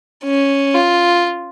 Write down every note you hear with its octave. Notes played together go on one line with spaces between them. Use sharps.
C#4
F4